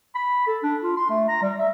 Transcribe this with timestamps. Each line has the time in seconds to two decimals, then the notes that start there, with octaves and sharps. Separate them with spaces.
0.15 B5
0.47 A4
0.63 D4
0.83 F4
0.96 C6
1.10 A3
1.28 A#5
1.42 G3
1.59 E5